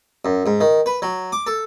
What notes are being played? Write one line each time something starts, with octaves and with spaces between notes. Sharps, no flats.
F#2
G#2
D#3
B4
F#3
D6
A4